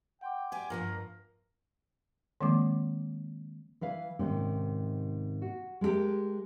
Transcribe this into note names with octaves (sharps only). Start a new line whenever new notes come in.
F#5 G5 C6 D6
G4 D5 G#5
G2 F3 A#3 A#4 A#5
D#3 F3 G#3 A#3 C4 D6
E3 B4 F5
G#2 C3 D#3 C#4
F#4
G#3 A3 C#4 G4 A#4